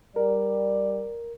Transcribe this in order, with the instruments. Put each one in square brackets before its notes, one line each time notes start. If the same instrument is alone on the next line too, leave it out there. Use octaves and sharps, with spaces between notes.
[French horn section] G3 D5 [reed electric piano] A#4